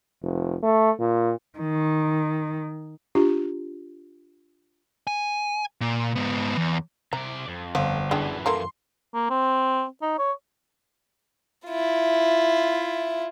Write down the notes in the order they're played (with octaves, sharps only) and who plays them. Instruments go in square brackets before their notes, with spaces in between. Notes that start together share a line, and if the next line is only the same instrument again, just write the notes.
[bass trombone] F1
A3
A#2
[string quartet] D#3
[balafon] D4 F4 G4
[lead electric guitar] G#5
A#2
G#2 B3
E2
[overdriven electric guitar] C3 D5 [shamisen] A#5
[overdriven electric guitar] F2
[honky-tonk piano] G1 [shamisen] F3
[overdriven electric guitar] F#2 E3 [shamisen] G#3 D4 G5
[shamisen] A3 A#3 A#5 [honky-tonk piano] C6
[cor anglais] A#3
C4
D#4
C#5
[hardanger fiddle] E4 F4